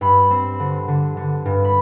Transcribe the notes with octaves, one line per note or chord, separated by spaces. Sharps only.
G2 B5
C4
D3
D3
D3
G2
B5